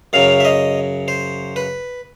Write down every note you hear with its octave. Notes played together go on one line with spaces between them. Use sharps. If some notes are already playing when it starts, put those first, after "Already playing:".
F#2 C#3 F#3 F5
E5
D#5
C5
B4